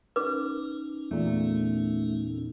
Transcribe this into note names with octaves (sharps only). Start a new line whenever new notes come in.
C#4 D#4 B4 D6
E2 A#2 A3